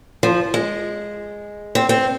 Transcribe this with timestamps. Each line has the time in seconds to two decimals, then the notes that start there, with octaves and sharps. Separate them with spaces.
0.23 F3
0.54 G#3
1.75 C4
1.89 C4